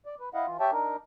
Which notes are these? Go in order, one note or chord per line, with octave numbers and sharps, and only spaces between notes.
D5
B4
E4 D#5 F5 F#5
E3 F4
G4 C#5 E5 G5 A5
D4 D#4 A#4